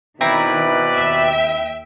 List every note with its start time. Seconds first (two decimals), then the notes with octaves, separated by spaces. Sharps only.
0.21 B2 D#3 C4 E4 B4 D5 A#5
0.95 D#2 E5 G5